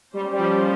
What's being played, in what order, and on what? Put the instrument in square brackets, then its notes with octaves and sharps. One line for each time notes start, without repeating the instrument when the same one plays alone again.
[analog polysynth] G3 [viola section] A#3 C#4 G4 C5
[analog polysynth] G3
F3